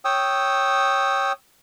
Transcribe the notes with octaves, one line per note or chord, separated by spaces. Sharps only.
C#5 G5 D#6 E6